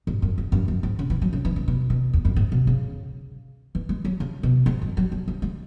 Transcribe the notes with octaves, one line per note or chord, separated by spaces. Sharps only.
G#2
F#2
E2
F#2
F#2
G#2
C#3
E3
F#3
C#3
E3
C#3
B2
B2
E2
F#2
G#2
B2
C#3
E3
G#3
F#3
C#3
B2
G#2
F#2
F#3
F#3
E3
G#3